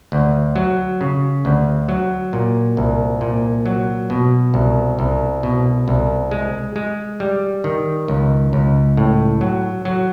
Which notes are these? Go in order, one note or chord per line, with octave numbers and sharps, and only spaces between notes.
D2
F#3
C#3
D2
F#3
A#2
C2
A#2
F#3
B2
C2
C2
B2
C2
G#3
G#3
G3
D#3
C#2
C#2
A2
F#3
F#3